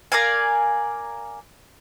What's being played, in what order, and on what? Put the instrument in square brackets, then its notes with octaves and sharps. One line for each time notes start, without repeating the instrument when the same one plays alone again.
[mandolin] A#4 D5 F5 G#5